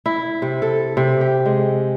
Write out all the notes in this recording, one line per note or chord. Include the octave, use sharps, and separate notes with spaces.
E4
C3
A4
C3
G4
G#3